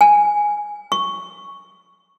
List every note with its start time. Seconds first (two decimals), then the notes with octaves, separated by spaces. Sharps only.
0.01 G#5
0.92 C#6